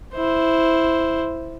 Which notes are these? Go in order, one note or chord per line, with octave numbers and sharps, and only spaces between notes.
E4 C5